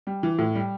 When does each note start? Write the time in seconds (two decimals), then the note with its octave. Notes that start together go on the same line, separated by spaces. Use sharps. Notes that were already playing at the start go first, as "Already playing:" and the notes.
0.07 G3
0.23 E3
0.39 A2
0.55 G3